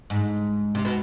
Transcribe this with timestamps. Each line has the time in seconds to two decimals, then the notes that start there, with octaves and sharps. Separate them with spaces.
0.10 G#2
0.75 C3
0.85 B2